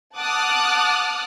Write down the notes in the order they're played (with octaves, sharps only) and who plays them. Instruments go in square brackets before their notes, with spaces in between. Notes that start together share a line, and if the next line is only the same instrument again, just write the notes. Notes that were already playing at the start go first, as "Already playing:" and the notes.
[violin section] F#5 A5 D6 D#6 F6 F#6